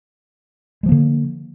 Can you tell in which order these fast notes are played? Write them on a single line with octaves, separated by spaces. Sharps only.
G#3 F3 A#3 D3